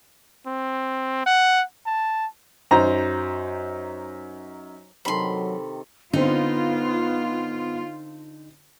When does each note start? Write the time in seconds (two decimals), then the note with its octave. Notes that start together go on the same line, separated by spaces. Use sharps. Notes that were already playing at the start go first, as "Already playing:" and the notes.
0.46 C4
1.26 F#5
1.86 A5
2.71 F#2 D#4 C5 A#5
5.05 C3 D#3 F#3 A4 B5 C6
6.13 D3 B3 C4 D#4 F4